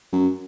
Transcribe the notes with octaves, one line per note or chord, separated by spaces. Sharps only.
F#2